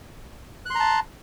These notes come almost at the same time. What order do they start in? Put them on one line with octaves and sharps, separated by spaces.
F#6 C6 A#5 A5